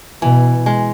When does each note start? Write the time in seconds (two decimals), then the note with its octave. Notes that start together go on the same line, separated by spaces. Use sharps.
0.22 B2 E3
0.66 G#3